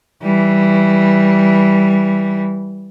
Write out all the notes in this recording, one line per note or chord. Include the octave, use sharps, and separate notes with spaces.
E3 G3